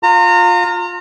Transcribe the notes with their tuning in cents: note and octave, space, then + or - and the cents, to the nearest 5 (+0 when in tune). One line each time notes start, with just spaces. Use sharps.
F4 +20 A#5 -30